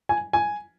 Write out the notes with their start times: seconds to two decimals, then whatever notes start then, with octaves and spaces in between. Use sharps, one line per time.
0.09 G#5
0.33 G#5